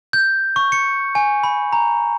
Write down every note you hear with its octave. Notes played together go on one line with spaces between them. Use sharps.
G6
C#6
C#7
G#5
B5
A#5